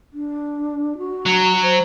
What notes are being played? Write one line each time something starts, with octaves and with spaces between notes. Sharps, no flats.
D4
F#4
F#3
C5